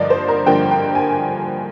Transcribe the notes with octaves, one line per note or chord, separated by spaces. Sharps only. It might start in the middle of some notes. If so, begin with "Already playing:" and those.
Already playing: G2 D3 F3 A#3 D5 D#5
C5
A#4
G2 D3 F3 A#3 G5
G5
G#5